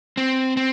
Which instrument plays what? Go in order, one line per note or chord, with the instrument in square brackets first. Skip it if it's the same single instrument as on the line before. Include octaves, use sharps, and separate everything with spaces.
[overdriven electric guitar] C4
C4